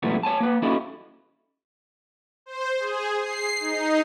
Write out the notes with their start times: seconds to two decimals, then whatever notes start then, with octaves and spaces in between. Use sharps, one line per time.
0.03 F#2 A#2 E3 G3 A3 B3
0.23 C#5 G#5 A5
0.40 A#3 B4
0.62 A#3 C#4 D#4 E4 F#4 A4
2.46 C5
2.80 G#4
3.19 C7
3.60 D#4